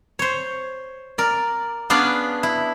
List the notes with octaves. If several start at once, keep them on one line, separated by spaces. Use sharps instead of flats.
C5 C#5
A#4 D5
B3 C#4 D4 G#4 D5 F5
E4